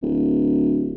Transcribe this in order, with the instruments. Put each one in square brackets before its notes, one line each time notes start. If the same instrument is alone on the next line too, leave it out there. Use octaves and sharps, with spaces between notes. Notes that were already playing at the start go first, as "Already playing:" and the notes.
[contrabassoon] D1